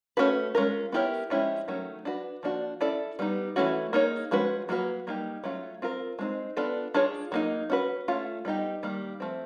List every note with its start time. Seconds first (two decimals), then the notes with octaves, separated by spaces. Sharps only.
0.17 A3 C#4 F#4 B4
0.55 G#3 C#4 F4 A#4
0.92 B3 E4 G4 A#4 C#5
1.30 F3 G#3 C#4 E4 G4
1.68 D#3 F#3 A3 C#4
2.05 D4 F#4 B4
2.43 F3 A#3 D4 F#4
2.81 C#4 E4 A4 D5
3.19 G3 B3 D#4
3.56 E3 A3 C#4 F#4
3.93 A#3 D#4 G#4 C#5
4.31 F3 G#3 C#4 F#4 B4
4.69 F#3 A#3 C#4 F#4 B4
5.07 G3 A#3 D#4 G4
5.44 F#3 A3 C#4 F4
5.82 C4 F4 A#4
6.19 G#3 C4 D#4
6.57 B3 D4 F4 A4
6.94 D4 F4 G#4 C#5
7.32 F#3 A#3 D#4
7.70 C#4 F#4 B4
8.08 A3 C#4 F4
8.45 G3 B3 D#4 G4
8.83 D#3 G3 A#3
9.20 F3 A3 C4